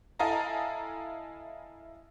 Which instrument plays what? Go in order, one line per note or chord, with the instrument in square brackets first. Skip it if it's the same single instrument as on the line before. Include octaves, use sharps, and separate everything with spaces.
[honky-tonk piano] E4 A4 D#5 F5 G#5 A#5